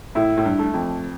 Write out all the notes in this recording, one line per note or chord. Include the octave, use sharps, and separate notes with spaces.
A2 E4
A2
G2
A3
F2